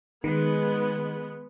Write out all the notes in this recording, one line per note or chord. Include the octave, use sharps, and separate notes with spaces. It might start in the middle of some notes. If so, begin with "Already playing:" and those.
D#3 G#3 B3